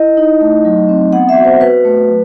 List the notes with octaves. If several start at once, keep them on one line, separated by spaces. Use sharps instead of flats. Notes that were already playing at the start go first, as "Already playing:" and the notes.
Already playing: E4 D#5
D#4
A3
F#3
C4
B3 F#5
E5
F#4
C5
F#4 B4
A3
F#3